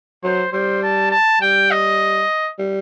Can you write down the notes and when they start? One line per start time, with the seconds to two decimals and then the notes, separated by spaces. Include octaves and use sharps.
0.23 F#3 C5
0.52 G3 C5
0.83 A5
1.11 A5
1.41 G3 G5
1.71 D#5
2.59 G3